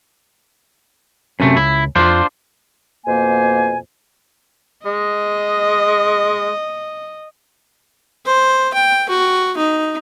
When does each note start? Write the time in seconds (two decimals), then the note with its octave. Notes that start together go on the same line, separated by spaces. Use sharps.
1.40 F#2 C3 A3 C#4
1.57 C#2 E4
1.96 F2 F3 D4 F4 C5
3.05 F2 B2 A#3 C5 G#5
4.85 G#3 D#5
8.26 C5
8.74 G5
9.09 F#4
9.57 D#4